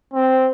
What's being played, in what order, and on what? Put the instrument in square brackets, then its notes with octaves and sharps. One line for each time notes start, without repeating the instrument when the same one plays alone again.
[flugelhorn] C4